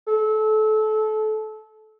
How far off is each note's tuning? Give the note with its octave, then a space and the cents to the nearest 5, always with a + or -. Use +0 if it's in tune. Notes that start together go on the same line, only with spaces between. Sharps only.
A4 -25